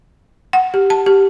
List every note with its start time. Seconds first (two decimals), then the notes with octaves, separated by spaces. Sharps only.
0.53 F#5
0.74 G4
0.90 A5
1.06 G4